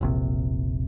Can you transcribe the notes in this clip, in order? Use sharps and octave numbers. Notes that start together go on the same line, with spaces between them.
E1 A#1 C3